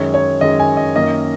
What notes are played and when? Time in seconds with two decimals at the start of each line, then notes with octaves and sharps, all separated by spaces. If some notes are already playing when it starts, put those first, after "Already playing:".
Already playing: F#2 D#3 G#3 C#5
0.14 C#5
0.41 F#2 D#3 G#3 D#5
0.60 G#5
0.77 D#5
0.95 F#2 D#3 A#3 C#4 D#5